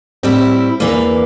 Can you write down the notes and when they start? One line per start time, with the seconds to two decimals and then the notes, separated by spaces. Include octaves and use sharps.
0.23 A2 G3 C4 E4
0.80 E2 E3 A#3 D4